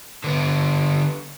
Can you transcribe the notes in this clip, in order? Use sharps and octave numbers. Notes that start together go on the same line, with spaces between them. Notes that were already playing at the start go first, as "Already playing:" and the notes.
D3 B3